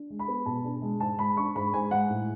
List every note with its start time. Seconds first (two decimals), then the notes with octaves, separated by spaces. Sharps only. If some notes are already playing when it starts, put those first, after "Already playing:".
Already playing: D4
0.10 G#3
0.19 B5
0.28 B3
0.46 B2 A5
0.64 D4
0.82 G#3
1.00 G#2 A5
1.19 G#3 B5
1.36 D4 C#6
1.55 G#2 B5
1.74 G#2 G#5
1.91 G#3 F#5
2.10 A2